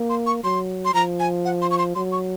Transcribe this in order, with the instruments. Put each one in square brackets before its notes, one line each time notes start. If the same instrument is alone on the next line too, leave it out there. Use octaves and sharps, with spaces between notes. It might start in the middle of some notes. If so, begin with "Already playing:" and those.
Already playing: [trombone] A#3
[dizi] C6
C#6
[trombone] F#3 [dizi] C6
[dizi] C6
[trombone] F3 [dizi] A#5
[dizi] G#5
F#5
C6
C#6
C6
[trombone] F#3 [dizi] C6
[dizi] C#6